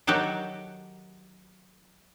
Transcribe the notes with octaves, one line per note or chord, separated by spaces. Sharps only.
D#3 F#3 F#4 G4 A4